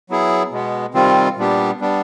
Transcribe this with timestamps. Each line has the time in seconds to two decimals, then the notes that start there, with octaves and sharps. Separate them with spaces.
0.10 F#3 B3 E4 G#4
0.51 B2 G#3 B3
0.94 C3 D#3 G3 C4 F4
1.37 A#2 G3 B3 D4 G4
1.80 G3 B3 D4